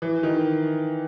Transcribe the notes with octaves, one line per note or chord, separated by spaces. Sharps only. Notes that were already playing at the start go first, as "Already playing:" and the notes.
E3
D#3